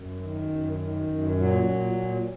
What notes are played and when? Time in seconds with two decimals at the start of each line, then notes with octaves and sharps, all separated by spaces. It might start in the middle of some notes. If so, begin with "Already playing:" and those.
Already playing: F#2
0.21 D#3
0.50 F#2
0.78 D#3
1.07 F#2
1.35 A#2 F#3
1.64 A#2
1.93 A#2